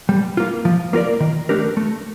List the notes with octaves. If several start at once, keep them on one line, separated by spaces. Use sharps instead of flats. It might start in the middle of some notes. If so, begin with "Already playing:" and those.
G3
A#3 F4
F3
A#3 F4 A#4 D5
D#3
A3 D4 G4 A#4
A3